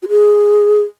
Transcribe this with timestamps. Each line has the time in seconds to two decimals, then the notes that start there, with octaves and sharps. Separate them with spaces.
0.03 F#4
0.09 G#4